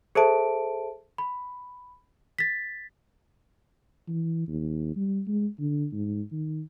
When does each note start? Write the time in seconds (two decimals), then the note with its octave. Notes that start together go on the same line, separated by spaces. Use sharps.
0.15 G#4 A4 C5 E5 A5 D7
1.18 B5
2.39 A6 B6
4.08 E3
4.48 D#2
4.96 G3
5.27 G#3
5.59 D3
5.92 G#2
6.32 D#3